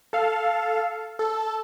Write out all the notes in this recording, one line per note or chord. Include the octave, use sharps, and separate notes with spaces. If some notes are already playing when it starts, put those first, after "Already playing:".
A4 F5
A4